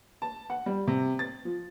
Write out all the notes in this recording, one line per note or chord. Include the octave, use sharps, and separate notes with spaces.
A5
F#5
G3
C3
A6
F3